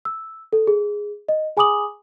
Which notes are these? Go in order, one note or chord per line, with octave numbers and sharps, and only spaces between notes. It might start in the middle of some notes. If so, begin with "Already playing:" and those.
E6
A4
G#4
D#5
G#4 G#5 B5 D6 D#6 F#7